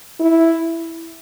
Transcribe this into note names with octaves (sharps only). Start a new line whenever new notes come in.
E4